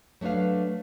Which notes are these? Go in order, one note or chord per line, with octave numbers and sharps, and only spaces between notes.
F#3 A3 D4 B4 F5